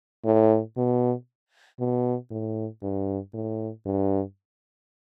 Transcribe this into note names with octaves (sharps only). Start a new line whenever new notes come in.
A2
B2
B2
A2
G2
A2
G2